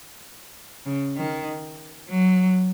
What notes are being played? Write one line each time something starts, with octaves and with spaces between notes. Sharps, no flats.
C#3
D#3
F#3